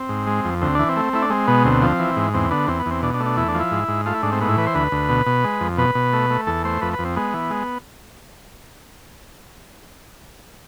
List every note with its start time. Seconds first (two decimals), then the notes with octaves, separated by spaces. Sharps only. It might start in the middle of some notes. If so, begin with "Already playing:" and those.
Already playing: C4
0.09 G#2
0.27 G#3
0.45 F2
0.61 D2 C4
0.75 E3 D4
0.89 C4
0.96 A3
1.13 A3 E4
1.22 D4
1.30 G#3 C4
1.47 B2 B3
1.64 D2 C4
1.82 F3
1.99 E3
2.16 G#2
2.34 E2 C4
2.51 D3 B3
2.68 E2 C4
2.79 B3
2.86 E2 C4
3.02 B2 D4
3.14 D4
3.20 A3
3.26 D4
3.37 E2 E4
3.48 D4
3.54 F3
3.60 E4
3.71 G#2
3.88 G#2
4.06 A3 F4
4.14 E4
4.23 G#2 D4
4.32 C4
4.41 A2 B3
4.49 E4
4.57 E3 B4
4.66 C5
4.75 D2 B4
4.92 D2
5.09 B2
5.26 B2
5.44 G#3
5.61 F2
5.78 B2 B4
5.95 B2
6.13 A3
6.30 A3
6.47 E2 A4
6.64 A3 C5
6.81 F2 B4
6.93 B4
6.99 F2
7.05 C4
7.16 G#3 B3
7.34 E3
7.50 G#3